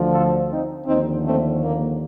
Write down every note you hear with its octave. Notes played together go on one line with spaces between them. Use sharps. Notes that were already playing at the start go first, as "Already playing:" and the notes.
Already playing: D2 D3 F3
F4 A4
C4 D#4
D#2 D3 F3 C4 D#4
A3 C4
A#3